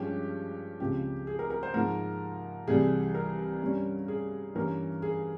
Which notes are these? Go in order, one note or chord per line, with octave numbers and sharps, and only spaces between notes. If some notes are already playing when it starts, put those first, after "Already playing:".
Already playing: G2 F3 G#3 C#4 G4
C#2 C#3 F3 G#3 C4 G4
G#4
A#4
A#4
C5
G#2 F3 A#3 A#4
C2 C3 E3 G3 G#4
A#4
G2 G3 C#4
G#4
G2 E3 A#3 C#4 A#4
G#4